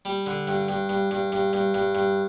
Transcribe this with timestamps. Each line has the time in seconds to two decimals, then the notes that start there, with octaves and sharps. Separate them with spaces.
0.05 G3
0.26 D3
0.47 G2
0.69 G2
0.89 G2
1.11 G2
1.32 G2
1.53 G2
1.74 G2
1.95 G2